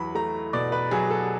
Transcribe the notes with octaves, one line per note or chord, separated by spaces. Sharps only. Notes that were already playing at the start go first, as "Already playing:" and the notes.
Already playing: E2 F#3 B5
A3 A#5
B2 D5
B4
F#3 G#4
A4